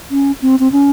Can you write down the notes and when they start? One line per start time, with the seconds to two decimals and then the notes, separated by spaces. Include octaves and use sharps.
0.11 C#4
0.42 C4
0.60 C4
0.72 C#4